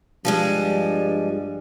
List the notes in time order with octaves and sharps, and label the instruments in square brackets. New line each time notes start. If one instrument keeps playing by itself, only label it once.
[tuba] G2 [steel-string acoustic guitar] F3 G3 G#3